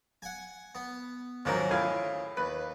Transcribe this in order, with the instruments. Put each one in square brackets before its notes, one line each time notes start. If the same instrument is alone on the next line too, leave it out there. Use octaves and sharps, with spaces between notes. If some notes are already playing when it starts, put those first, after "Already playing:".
[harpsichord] F#5 G#5
B3
[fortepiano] D#2 G#2 A#4 [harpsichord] F3 F#3 C#4
[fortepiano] A2 F4 G#5 [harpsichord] C#3
[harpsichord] D#2 [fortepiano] B4